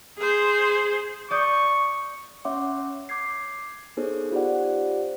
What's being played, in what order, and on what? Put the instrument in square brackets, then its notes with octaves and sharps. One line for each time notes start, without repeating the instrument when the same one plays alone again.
[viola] G#4 C5
[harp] D5 D#6 G6 [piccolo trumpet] C#6
[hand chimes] C#4 C#5 E5 F#5 C6 D6
D6 G6 G#6 C7
B3 D#4 G#4 A4 C5 C#5
F4 G4 C5 D5 F#5